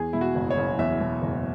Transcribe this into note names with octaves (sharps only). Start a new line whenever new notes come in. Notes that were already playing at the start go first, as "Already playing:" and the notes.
Already playing: E2 G#4
B2 E4
F#4
F#1
C#5
F#1
E2 E5
B2
F#1